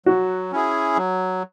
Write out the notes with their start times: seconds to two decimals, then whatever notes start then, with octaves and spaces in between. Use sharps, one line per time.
0.06 F#3 F#4
0.52 C#4 E4 G#4
0.97 F#3